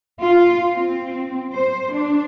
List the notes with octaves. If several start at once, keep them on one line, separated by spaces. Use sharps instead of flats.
F4
C4
C5
D4